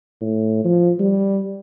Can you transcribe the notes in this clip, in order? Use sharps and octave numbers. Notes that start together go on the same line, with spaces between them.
A2
F3
G3